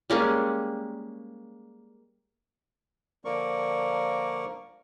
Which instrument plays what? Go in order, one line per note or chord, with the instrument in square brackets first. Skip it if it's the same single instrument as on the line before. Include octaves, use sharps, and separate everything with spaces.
[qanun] G3 G#3 A#3 C#4
[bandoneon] D3 F3 A#3 A#4 D5 C#6